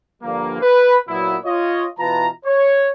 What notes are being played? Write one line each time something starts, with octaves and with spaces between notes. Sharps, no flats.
G2 D3 F3 G3 A#3
B4
A#2 F#3 B3 E4
F4 C#5 D#5
B2 E3 F4 B4 A5 A#5
C#5